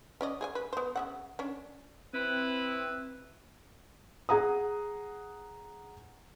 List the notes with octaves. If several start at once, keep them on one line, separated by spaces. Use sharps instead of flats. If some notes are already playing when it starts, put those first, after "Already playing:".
C#4 D5 D#5
G#4 D#5 G#5
B4
B3 C5
C#3 E5 F#5
C#4 D4
C4 E4 B4
G#4 F#5 A#5 D#6